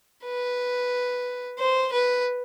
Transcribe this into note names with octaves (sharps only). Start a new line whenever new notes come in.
B4
C5
B4